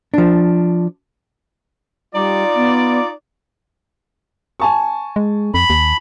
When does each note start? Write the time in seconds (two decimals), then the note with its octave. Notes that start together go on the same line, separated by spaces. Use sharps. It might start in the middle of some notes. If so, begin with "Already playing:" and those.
0.14 F3 D4
2.14 G3 D#4 F4 D5
2.55 B3
4.60 G#5 A5 C#6
5.16 G#3
5.54 F2 B5
5.70 D#2